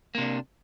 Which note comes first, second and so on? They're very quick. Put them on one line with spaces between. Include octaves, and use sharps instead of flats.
A#3 C3 D4